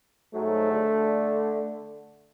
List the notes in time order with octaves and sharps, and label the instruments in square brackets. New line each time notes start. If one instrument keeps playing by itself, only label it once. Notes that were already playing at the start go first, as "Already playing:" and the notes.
[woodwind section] G#2 F#3 [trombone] A3
[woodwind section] D3